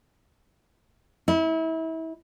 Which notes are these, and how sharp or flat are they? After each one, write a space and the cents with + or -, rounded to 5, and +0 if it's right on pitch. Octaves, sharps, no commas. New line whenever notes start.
E4 -30